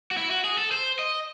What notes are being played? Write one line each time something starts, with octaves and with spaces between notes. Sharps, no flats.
F#4
E4
F#4
G#4
A4
C5
D#5